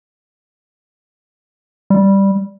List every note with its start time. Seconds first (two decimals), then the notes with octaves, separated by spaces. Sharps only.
1.90 G3